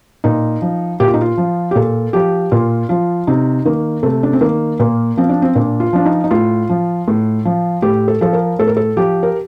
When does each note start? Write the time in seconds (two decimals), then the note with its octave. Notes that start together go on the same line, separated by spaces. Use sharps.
0.24 A#2 D#4
0.62 F3
1.00 A#2 G4
1.08 F4
1.14 D#4
1.21 F4
1.38 F3
1.71 G4
1.76 A#2 A4
2.13 F3 G4
2.51 A#2 F4
2.89 F3 F4
3.27 C3 D#4
3.65 D#3 A#3
4.03 C3 A3
4.23 D4
4.33 C4
4.41 D#3 A#3
4.80 A#2 A#3
5.17 F3 C4
5.29 D4
5.42 C4
5.55 A#2 D4
5.80 F4
5.93 F3 D4
6.05 D#4
6.24 D#4
6.31 A2 F4
6.69 F3
7.08 A2
7.45 F3
7.82 A2 G4
8.08 A4
8.21 F3 A4
8.33 A#4
8.59 A2 A4
8.67 A#4
8.77 A4
8.97 F3 G4
9.23 A#4